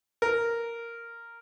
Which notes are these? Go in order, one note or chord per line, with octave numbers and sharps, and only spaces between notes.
A#4